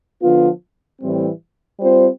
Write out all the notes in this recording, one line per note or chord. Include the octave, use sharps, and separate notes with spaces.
D3 F3 B3 F4
A2 E3 G3 C4
G3 C4 F4 C5